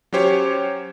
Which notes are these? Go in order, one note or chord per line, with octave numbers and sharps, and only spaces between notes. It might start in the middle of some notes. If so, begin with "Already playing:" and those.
F#3 C#4 G4 C5 C#5